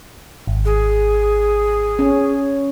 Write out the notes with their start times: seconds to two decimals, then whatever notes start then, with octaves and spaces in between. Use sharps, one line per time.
0.47 G#1
0.65 G#4
1.99 C#4